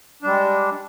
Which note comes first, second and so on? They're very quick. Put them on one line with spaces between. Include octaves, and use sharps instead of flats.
D4 G3 G#3